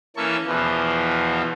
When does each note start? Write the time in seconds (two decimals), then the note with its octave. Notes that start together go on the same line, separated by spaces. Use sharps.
0.16 E3 A#3 C#4 A4 C#6
0.47 E2 B2 E3 F3